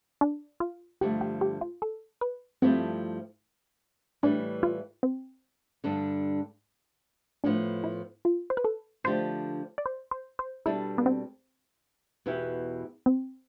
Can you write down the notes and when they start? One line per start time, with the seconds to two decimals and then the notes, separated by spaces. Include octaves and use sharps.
0.21 D4
0.60 F4
1.01 G2 D3 F3 A3 G4
1.21 G4
1.41 G4
1.61 F4
1.82 A4
2.21 B4
2.62 G2 F3 A3 C4 E4 G4
4.23 A2 E3 G3 D4
4.63 F4
5.03 C4
5.84 G2 D3 G3 D4
7.44 A2 F3 B3 D4
7.84 E4
8.25 F4
8.50 C5
8.57 B4
8.64 A4
9.04 D3 F3 A3 D4 G4 C5
9.78 D5
9.86 C5
10.11 C5
10.39 C5
10.66 B2 G3 D4 E4 A4
10.98 B3
11.06 C4
12.26 E2 B2 B3 E4 G4
13.06 C4